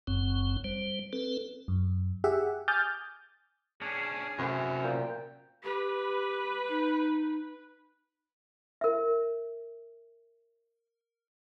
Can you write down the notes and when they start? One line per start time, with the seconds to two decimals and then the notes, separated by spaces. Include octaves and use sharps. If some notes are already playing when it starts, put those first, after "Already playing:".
0.07 F#1 F#2 C4
0.64 G3 C5
1.13 C4 A4 B4
1.68 F#2
2.24 G4 G#4 E5 F#5
2.68 G#5 D6 D#6 F6 G6 A6
3.81 C#4 D4 G#4
4.39 F#2 A2 C3
4.83 A#2 G5
5.64 G4 B4
6.69 D#4
8.81 A#4 E5